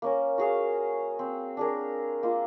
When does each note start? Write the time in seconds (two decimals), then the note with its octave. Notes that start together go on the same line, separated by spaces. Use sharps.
0.02 A#3 C#4 A#4
0.38 F#4 G#4 F5
1.19 C4
1.57 D4 G#4 A#4
2.23 A#3 F4